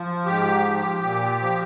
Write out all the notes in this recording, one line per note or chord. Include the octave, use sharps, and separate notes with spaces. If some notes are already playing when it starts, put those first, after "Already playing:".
Already playing: F3
G#2 G4
F3
A#2
F3